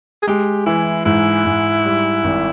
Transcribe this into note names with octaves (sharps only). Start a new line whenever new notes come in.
G#4
G#3 G4
E3 E4
G#2 E4
G#2
G3
G#1